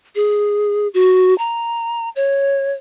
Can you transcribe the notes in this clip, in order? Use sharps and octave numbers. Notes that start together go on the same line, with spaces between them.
G#4
F#4
A#5
C#5